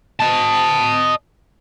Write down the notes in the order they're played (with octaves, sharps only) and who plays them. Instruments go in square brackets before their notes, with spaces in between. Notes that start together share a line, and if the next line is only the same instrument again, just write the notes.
[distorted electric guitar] D#5 A5